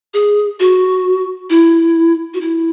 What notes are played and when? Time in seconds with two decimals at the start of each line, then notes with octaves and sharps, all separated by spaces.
0.14 G#4
0.60 F#4
1.50 E4
2.34 F#4
2.41 E4